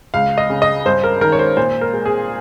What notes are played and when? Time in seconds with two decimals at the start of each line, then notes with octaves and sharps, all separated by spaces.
0.14 C#2 F5
0.38 D#5
0.50 C#3
0.62 D#5
0.85 G2 C5
1.04 A#4
1.21 D#3 A#4
1.32 C#5
1.39 C5
1.57 A#2 C5
1.81 A#4
1.94 G#3
2.05 G#4